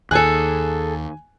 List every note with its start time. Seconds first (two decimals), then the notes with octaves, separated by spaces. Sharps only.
0.11 D#2 G#4 A4 G#5 F#6